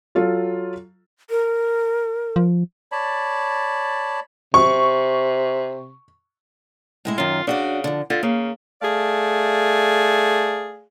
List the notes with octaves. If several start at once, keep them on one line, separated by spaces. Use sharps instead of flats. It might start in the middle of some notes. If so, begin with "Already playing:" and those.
F#3 F4 A4
A#4
F3
C#5 D5 A5 B5
C3 C#6
A2 G#3 E4
F#2 D#3 F4
C#3 D4 F#4 D5
D3 F3
D3 F4
C#3 A#3
A3 G#4 D5 F5